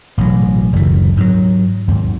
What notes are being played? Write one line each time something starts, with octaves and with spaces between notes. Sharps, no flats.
A1 B2 F3 F#3
F#1 D2 E3
G#2 F#3
D#2 G#2